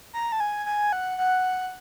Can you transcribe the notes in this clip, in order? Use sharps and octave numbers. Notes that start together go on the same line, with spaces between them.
A#5
A5
G#5
G#5
F#5
F#5